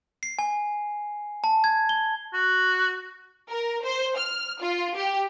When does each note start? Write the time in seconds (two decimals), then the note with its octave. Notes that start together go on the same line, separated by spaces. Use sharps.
0.23 C7
0.39 G#5
1.44 A5
1.64 G#6
1.89 G7
2.33 F#4
3.50 A#4
3.84 C5
4.17 F6
4.62 F4
4.95 G4